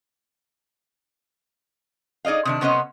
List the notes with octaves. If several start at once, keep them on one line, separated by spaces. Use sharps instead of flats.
D#4 G#4 D5 D#5 F5
C3 D#3 D4
C3 B3 C#4 C5 C#5 D#5